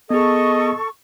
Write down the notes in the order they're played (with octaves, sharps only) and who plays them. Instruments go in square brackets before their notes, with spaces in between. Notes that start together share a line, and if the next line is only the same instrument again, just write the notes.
[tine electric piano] B3 G#4 [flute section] A4 C#6 [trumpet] D#5